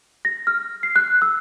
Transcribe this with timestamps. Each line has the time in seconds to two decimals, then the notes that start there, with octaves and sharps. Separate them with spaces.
0.25 A#6
0.47 F6
0.83 C7
0.96 F#6
1.22 E6